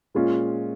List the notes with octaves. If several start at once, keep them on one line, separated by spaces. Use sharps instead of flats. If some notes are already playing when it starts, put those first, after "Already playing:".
A#2 G#3 C#4 F4